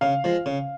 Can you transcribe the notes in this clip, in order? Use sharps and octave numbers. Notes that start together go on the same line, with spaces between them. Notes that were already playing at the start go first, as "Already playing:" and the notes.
C#3 F5
F3 G#3
C#3